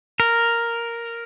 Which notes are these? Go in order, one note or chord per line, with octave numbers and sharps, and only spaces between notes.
A#4